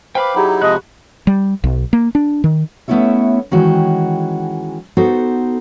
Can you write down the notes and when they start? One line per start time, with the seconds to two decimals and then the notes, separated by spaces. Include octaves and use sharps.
0.15 B4 C5 F5 G5 B5 D6
0.35 F#3 D#4 E4 G4 G#4 F#5
0.62 C3 F3 G#3 F#4 D#5 B5 F#6
1.27 G3
1.64 B1
1.93 A#3
2.15 D4
2.44 D#3
2.88 A3 B3 C#4 E4 C#5 E5
3.51 D#3 E3 G#3 C#4 F#4 G5
4.97 B3 D#4 F#4 A4 C5